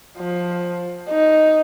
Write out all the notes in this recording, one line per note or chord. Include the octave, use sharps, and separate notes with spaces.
F3
D#4